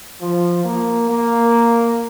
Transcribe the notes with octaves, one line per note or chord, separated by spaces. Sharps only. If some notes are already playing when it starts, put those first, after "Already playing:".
F3
A#3
A#3